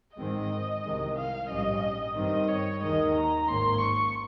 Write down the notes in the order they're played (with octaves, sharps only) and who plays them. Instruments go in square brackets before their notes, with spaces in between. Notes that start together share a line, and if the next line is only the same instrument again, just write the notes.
[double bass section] G#2 D#3 G#3 C4 [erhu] D#5
[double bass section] C2 C3 D#3 G#3
[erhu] F5
[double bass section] A#1 G#2 G3 C#4 [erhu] D#5
[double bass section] G2 D#3 G3 C4 [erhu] D#5
[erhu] C#5
[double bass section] D#2 D#3 G#3 [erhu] D#5
[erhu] A#5
[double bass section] G#1 G#2 D#3 A#3 C#4 [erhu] C6
[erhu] C#6